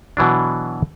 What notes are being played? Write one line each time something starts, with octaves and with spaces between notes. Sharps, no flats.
B2 E3 F#3 D4